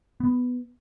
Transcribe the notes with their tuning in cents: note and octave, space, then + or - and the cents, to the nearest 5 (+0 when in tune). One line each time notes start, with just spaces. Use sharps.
B3 +5